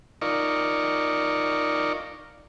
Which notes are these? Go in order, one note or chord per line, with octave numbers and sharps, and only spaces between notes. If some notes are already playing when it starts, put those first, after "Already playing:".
D#4 F4 A#4 D5 C#6